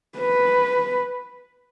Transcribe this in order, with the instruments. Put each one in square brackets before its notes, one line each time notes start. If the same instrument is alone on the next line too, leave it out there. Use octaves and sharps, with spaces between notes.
[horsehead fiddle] B4